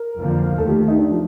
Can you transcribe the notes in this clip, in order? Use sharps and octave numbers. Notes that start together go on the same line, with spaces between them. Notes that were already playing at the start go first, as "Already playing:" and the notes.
Already playing: A#4
F2 D3 F3 A#3
D#2 D#3 A3 A4
G4
D#4
D4
F3